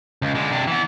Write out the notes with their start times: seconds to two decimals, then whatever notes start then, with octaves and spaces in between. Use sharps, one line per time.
0.22 C#2
0.35 D3 G#3
0.51 C3 D4
0.67 E3 B3